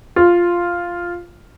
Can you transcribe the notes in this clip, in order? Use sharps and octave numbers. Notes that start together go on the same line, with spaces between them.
F4